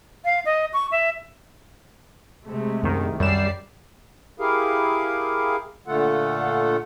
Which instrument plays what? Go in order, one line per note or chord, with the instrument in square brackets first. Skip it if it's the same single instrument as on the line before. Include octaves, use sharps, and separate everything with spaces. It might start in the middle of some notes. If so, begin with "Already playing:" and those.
[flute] F5
D#5
C#6
E5
[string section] C3 G#3 A3
[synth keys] C2 D#3 [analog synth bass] F#2
[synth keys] F#2 E7 [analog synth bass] G3 [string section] G4 D5 C7
[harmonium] E4 G4 G#4 A#4 F5
A#2 D3 A3 F4 A4 F#5